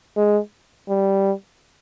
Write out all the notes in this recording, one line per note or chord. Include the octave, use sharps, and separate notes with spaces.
G#3
G3